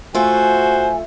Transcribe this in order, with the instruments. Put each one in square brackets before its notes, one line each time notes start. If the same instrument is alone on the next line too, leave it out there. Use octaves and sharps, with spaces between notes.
[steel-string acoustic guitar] A3 F4 [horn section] F#4 C5 [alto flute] G#5